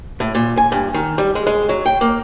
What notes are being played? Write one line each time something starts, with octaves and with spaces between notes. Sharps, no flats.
A2
A#2
G#5
G2
D#3
G3
G#3
G#3
F#3
G5
A#3